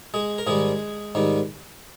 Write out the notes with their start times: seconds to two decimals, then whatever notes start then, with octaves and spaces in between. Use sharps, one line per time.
0.14 G#3 G#4
0.38 A#4
0.47 G#2 D#3 G3 G#3 G#4
1.15 G#2 D#3 G3